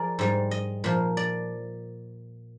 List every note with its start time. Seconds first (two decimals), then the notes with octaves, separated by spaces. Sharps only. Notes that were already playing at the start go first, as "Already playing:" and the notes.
Already playing: F3 G#4 A#4 D5
0.19 G#2 G3
0.51 D#5
0.84 A#2 F3
1.17 D5